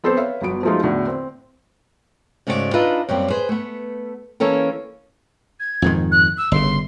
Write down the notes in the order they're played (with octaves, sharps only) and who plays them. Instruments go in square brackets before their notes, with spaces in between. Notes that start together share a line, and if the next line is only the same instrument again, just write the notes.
[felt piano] B3 C4 A4 B4 C5
B4 C#5 E5 F5
G1 F#3 B3 D7
F3 F#3 G#3 A3 D#4 F4
E2 A2 D3 F#4
C4
[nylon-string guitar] G#2 C#3 A3 F#4 A4 D5
D4 D#4 F4 B4 D#5 E5
F#2 G3 A#3 C4
G#4 B4 C5
A3 B3
E3 A#3 C#4 A4 A#4
[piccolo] G#6
[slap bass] F2 G#2 D#3
[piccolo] F#6
E6
[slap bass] G1 C#3 [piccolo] C6